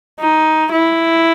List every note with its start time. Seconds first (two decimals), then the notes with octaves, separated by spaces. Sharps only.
0.20 D#4
0.72 E4